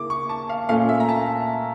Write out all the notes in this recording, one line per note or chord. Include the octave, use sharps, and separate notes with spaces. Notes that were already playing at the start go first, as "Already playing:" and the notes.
Already playing: C#3 A#3 E4 D6
C#6
A5
F5
A#2 A3 C#4 F5
E5
A#5
A5